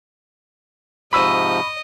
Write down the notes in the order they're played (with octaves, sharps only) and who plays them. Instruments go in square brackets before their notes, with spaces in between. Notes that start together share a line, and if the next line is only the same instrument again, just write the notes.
[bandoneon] G#2 C3 F3 [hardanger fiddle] D#5 [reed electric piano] B5 [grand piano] C#6 E6 D#7